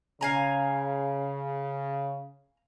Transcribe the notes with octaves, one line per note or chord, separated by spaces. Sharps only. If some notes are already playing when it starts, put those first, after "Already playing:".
C#3 F5 G#5 A#5